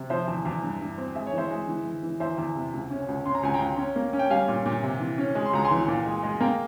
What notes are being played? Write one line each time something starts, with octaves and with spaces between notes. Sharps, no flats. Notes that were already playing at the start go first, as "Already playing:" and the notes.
Already playing: C3
F3 C5 E5
E2
E2
G2
G2
C4
G#3 E5
C#5
E3
C5 E5
G#3
E3
E3
E3
E2 C5 E5
E2
C3
C#2
C#4
C#2
C#4 C6
A#5
C#2 G#5
G5 A#5
C#2
C#4
A#3
C#4
G5
G3 F5 G#5
A#2
A#2
C3
E3
C#4
G#3
C6
C#2 A#5
G#5 C6
E3
A#2
G#3
G#3
A#3 G5 A#5